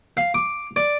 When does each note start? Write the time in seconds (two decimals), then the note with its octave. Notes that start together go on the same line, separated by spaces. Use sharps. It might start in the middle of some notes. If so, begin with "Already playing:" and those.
0.17 F5
0.34 D6
0.76 D5